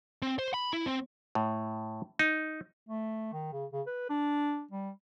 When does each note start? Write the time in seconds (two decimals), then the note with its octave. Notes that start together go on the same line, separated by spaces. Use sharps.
0.22 C4
0.39 C5
0.54 B5
0.73 E4
0.86 C4
1.35 A2
2.19 D#4
2.89 A3
3.33 D#3
3.53 C#3
3.73 C#3
3.87 B4
4.09 D4
4.71 G3